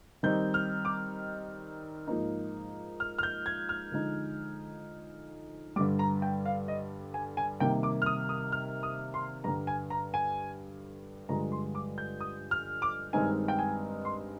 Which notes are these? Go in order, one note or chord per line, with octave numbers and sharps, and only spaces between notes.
D#3 G3 C4 D#4 G6
F6
D6
G#2 F3 A#3 D#4
F6
F6
G6
G#6
F6
D3 F3 G#3 D#4
G2 D3 G3 D6
A#5
G5
F5
D#5
G#5
G#5
C3 D#3 G3 A#3 G5
D6
F6
D#6
D#6
F6
D#6
C6
G2 D3 G3 A#5
G#5
A#5
G#5
G2 D3 F3 G#3 A#5
C6
D6
G6
D#6
F6
D6
G2 D#3 G#3 C4 D#4 G#5
G5
G#5
C6